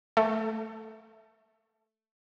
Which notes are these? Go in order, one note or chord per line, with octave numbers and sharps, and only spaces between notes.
A3